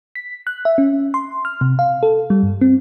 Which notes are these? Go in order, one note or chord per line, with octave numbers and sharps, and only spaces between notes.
B6
F#6
E5
C#4
C6
F6
C3
F5
A4
G3
G2
C4